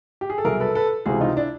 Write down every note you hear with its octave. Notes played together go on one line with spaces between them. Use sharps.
G4
G#4
A4
C2 B2 F#3 G#4 A#4
A4 B4
A4 B4
C#2 C3 E3 F#4 G#4
D#4 F4
D4 E4